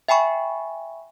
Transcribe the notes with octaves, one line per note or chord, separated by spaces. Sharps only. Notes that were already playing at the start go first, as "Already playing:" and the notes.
E5 G5 G#5 B5 C#6